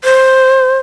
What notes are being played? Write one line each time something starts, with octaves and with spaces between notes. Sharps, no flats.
C5